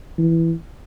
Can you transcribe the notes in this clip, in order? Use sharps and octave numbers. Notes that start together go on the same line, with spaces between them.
E3